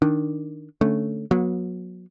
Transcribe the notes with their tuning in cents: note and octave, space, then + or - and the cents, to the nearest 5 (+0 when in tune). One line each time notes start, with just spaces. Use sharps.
D#3 +0 D4 +0
D3 +0 A3 +0 C#4 +0
F#3 -25 B3 -45